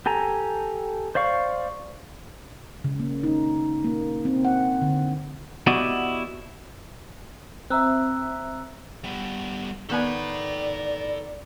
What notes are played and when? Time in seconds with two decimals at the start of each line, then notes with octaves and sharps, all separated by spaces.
0.06 G4 A4 G#5 A#5
1.15 C5 D5 F5 C#6
2.84 C#3
3.00 A#3
3.23 D#4
3.84 A#3
4.25 C4
4.45 F#5
4.82 D3
5.67 B3 E4 F#4 G4 D5 D#5
7.70 C4 E5 A#5 E6 F#6
9.04 G3 B3
9.89 D#3 B3 A4 D5 G#5 B5